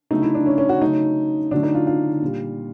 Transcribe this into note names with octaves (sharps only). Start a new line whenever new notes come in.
C#3 F#3 A3 D#4
E4
D4
C#4
C#4
F#4
C#3 F#3 A3 D#4
D3 F#3 A3 D4
D#4
F4
F4
A#2 G3